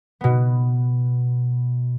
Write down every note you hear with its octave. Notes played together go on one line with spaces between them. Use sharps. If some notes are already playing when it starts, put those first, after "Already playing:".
B2 B3